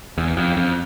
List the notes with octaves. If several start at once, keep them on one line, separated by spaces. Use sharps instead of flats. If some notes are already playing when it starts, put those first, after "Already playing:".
E2
F2
F2